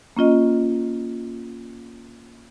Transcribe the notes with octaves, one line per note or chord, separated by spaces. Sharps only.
A#3 C#4 F4 D#5